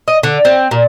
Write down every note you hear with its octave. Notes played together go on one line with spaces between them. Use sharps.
D#5
D3
C4
A#2